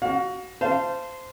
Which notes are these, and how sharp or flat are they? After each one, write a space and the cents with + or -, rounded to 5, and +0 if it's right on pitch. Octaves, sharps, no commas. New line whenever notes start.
F#4 +20 F5 +40
C5 -15 F5 -25 A5 +0